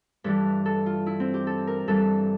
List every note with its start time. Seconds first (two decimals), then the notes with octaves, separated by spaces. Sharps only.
0.24 G2 E3 G3 A4
0.66 A4
0.86 F4
1.06 E4
1.20 C4
1.34 G4
1.47 A4
1.67 A#4
1.88 G2 E3 G3 A4